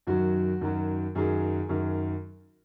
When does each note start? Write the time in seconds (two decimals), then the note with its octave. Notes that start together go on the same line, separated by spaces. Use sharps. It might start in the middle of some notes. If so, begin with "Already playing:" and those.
0.07 F#2 D#3 F#3 F#4
0.61 F#2 D#3 F#3
1.15 F#2 D#3 F#3 G#4
1.69 F#2 D#3 F#3